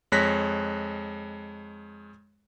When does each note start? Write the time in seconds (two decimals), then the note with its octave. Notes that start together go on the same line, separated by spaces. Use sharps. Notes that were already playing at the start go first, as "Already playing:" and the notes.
0.12 F2 G#3 C#5 F#6 A#6 B6